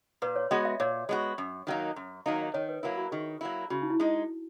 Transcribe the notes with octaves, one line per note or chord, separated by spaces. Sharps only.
A#2 B4
C#5
G#3 B3 F#4 D#5
E5
A#2 C#5
G#3 B3 F#4
F#2
D#3 F#3 A#3 D#4
F#2
D#3 F#3 A#3 D#4
D#5
D#3 C#5
B4
F#3 A#3 E4 A#4
F#4
D#3 G#4
F#3 A#3 E4
C#3 F#4
D#4
E4
G#3 D#4